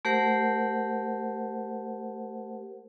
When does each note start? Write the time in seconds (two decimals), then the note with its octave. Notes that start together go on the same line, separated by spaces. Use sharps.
0.05 A3 G4 A#4 C5 F#5